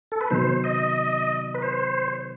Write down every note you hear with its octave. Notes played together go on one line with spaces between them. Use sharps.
A4
B4
C3 D#3 F#3 B3 D#4 C5
D#5
B4
C5